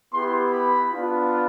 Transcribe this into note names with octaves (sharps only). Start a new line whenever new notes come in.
B3 E4 G4 C6
B5
B3 D4 F4